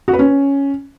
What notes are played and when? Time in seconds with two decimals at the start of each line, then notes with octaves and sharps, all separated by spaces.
0.08 F#4
0.13 B4
0.19 C#4